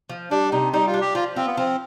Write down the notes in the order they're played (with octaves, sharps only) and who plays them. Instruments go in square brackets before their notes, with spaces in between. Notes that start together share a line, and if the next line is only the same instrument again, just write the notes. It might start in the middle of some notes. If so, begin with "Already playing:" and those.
[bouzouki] F3
[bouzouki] G3 [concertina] D4
[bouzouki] C3 [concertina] D#4
[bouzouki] G3 [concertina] D#4
[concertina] F4
[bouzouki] D4
[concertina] G4
[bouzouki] F3 [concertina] F4
[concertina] C4 [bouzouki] F4
[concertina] B3
[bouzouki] F3 [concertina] C4